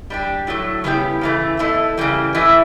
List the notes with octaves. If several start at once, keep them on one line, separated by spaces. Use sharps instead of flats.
G3 D4 G4
A2 F#3 A3
C#3 G3 B3 E4 G4
C#3 E3 A3
B2 A3 E4
C#3 E3 G3
A2 E3 A3 E4